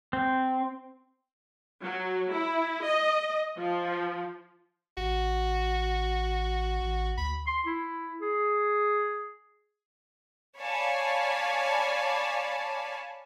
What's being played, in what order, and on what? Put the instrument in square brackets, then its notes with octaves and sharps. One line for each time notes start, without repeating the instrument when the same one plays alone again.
[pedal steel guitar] C4
[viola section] F#3
E4
D#5
F3
[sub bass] A1 [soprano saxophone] F#4
[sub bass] A1
[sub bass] D2 [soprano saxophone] B5
[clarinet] C6
E4
G#4
[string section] C#5 D5 F5 G#5 A5 B5